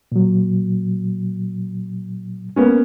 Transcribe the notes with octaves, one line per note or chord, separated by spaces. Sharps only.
A#2 F#3
A#3 B3 C#4